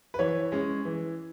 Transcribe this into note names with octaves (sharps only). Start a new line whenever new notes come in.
B4
E3 C#5
G#3 C#4
E3